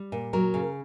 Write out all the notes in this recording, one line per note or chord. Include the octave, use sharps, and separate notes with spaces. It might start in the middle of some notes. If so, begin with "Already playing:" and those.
Already playing: G3
A#2
F#3 A#4
C#3